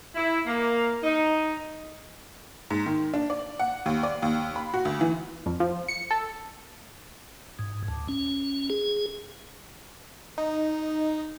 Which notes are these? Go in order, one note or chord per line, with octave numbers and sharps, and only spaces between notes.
E4
A#3
D#4
G#2
D#3
D4
D5
F#5
D#2
D5
D#2
B5
F#4
D2
E3
F2
F3
C#7
A4
G#2
D2
C#4
G#4
D#4